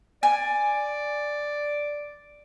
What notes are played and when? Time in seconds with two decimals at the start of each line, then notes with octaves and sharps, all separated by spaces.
0.23 D5 G#5